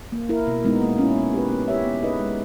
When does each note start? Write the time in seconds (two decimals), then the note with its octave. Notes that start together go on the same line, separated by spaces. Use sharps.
0.12 A#3
0.29 E4 A#4
0.47 B2
0.64 G#3 B3 D#4
0.82 A#3
0.98 C#4 E4
1.16 B3
1.33 G4 B4
1.51 B3
1.68 E4 G4 C#5 E5
1.85 B3
2.03 D#4 G#4 B4 D#5
2.19 G#3